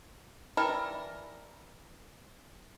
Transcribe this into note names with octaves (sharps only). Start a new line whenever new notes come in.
E3 G3 A#4 A5